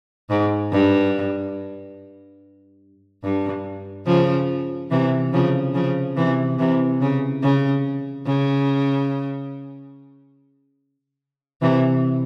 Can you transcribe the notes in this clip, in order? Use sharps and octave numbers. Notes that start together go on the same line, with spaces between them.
G#2
G2
G2
C#3 F3
C3 E3
C#3 F3
C#3 F3
C3 E3
C3 E3
C#3
C#3
C#3
C3 E3